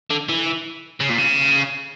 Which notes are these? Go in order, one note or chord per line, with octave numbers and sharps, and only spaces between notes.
D3
E3
C#3
A#2
C#3